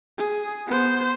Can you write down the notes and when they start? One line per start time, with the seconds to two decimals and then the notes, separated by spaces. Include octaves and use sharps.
0.18 G#4
0.67 B3 C5